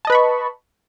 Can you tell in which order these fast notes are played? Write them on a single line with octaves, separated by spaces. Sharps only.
A5 D#5 B4 B5 C#6